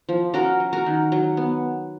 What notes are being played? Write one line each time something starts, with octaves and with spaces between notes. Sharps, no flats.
F3
C#4 F#4 A#4
F#3
F#4 A#4
D#3
F#3
B3